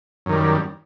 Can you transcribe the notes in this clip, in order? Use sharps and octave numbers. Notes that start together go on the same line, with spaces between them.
F#2 D#3 G3